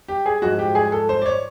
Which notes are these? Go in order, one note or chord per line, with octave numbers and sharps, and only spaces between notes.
G4
G#4
G#2 F3 G#3 F#4
G4
G#4
A4
C5
D5
C#5